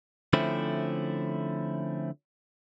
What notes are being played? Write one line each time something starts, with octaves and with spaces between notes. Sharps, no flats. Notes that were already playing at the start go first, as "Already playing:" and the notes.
D3 F3 A3 C4 C#4 E4